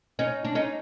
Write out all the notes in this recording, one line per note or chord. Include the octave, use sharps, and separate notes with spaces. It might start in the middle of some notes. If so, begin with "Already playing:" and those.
C#4 D#4
D4
C#4 D#4